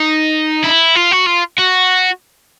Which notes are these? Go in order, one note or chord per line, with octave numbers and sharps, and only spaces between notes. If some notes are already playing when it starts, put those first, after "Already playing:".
Already playing: D#4
E4
F4
F#4
F4
F#4